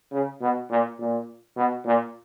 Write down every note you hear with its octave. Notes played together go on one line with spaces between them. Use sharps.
C#3
B2
A#2
A#2
B2
A#2